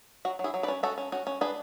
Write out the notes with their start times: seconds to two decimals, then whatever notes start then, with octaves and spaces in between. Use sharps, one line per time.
0.25 F#3 F#4
0.39 F#3
0.44 E4 G#4
0.54 F#3
0.63 B4 D5
0.68 C#4
0.83 C#4 F#4 A4
0.98 C#4
1.12 C#4 F#4
1.27 C#4
1.41 D4 G#4 B4